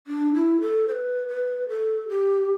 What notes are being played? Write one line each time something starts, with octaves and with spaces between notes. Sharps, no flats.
D4
E4
A4
C5
B4
B4
A4
G4